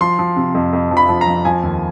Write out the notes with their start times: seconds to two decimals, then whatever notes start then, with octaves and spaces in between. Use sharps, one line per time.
0.01 F3 C6
0.19 F3
0.36 C3
0.55 F2
0.73 F2
0.91 F3
0.97 B5
1.09 F3
1.21 A#5
1.27 F2
1.45 F3 G#5
1.63 D#2